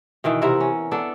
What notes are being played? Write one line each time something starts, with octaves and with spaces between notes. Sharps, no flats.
B2 D#3 E3
C3 B3 E4 A#4
C#4
B3 D4 A4